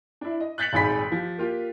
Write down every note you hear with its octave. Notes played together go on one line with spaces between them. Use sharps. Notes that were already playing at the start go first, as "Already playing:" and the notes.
D4 E4
D#5
F#6 G6 A6 B6 C#7 F#7
D#1 G#1 G#2 G#4 B5 B6
F3 G4
A#3 F4 G4